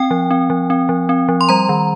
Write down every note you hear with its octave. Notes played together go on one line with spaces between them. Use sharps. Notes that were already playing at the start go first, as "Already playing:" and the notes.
Already playing: C4 G5
F3
C4
F3
C4
F3
C4
F3
C6
G3 A#5
D#3